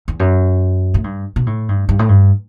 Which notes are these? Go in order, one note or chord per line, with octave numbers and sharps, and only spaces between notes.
E2
F#2
A2
G2
B2
A2
G2
G2
A2
G2